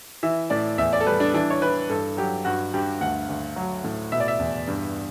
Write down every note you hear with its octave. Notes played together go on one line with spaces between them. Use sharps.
E3 E5
A2 D5
E2 E5
D5
A4
G3 B4
D4
E3 D4
C#5
E3 B4
G2 A4
F#3 G4
G2 F#4
G2 G4
D2 F#5
D2
F#3
A2
B2 E5
D5
E5
E2
G2